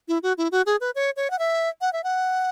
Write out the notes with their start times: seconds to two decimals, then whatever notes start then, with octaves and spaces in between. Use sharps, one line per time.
0.08 E4
0.23 F#4
0.38 E4
0.52 F#4
0.66 G#4
0.81 B4
0.95 C#5
1.16 C#5
1.31 F#5
1.39 E5
1.81 F#5
1.93 E5
2.04 F#5